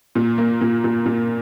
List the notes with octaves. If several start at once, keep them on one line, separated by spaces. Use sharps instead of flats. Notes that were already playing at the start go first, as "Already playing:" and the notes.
A#2
A#3
A#2
A#2
A#2